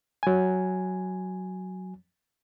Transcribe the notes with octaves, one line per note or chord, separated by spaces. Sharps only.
F#3 G#5